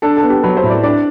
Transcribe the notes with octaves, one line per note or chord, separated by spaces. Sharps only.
D4 A4
A4
B3
G4
F#3 B4
C5
A2
D5
D4 D5